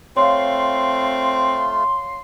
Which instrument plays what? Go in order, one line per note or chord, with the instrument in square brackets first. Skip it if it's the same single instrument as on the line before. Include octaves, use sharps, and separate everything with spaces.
[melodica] A3 F4 [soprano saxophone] C4 [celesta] C#5 F5 [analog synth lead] C6